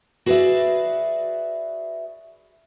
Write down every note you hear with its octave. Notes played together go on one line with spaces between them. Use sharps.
F#4 G#4 B4 C#5 D5 E5